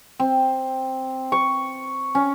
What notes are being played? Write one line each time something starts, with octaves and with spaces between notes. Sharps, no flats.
C4
C#6
C#4